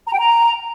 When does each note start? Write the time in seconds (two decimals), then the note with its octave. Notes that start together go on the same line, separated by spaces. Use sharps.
0.07 A#5
0.13 G5
0.19 A#5